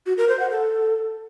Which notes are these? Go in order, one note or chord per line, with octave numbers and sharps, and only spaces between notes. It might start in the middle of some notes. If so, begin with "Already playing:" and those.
F#4
A#4
C5
F#5
A4